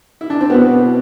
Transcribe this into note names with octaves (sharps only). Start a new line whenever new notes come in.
E4
D4
C4
B2 B3